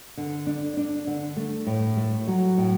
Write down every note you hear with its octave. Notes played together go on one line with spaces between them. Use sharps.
D3
D4
D4
D3
A3
A2
A3
F#3
A2